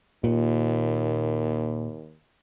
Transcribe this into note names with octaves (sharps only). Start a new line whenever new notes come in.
D#2 A#2